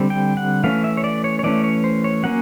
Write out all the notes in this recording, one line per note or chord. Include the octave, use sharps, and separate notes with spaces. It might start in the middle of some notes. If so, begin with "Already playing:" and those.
Already playing: D3 G3 C4
G5
F#5
E3 A3 C#4 F5
E5
C#5
D5
C#5
C#5
E3 A3 C#4 D5
C#5
C5
C#5
F#3 A#3 C#4 F#5